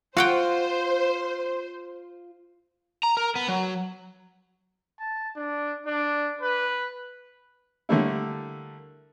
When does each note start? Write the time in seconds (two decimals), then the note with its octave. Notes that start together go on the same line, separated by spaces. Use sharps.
0.17 F4 F#4 C5 F#5 G5
3.03 A#5
3.17 A#4
3.35 B3
3.48 F#3
4.99 A5
5.36 D4
5.86 D4
6.41 B4
7.89 D3 G3 A3 A#3 E4